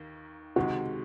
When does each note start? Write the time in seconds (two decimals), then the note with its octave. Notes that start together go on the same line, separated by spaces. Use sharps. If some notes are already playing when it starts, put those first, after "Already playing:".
Already playing: D#2 D#3 A#3
0.56 C#2 C3 D#3 G#3 F#4